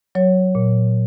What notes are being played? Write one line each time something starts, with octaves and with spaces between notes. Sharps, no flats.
F#3 C#5
A#2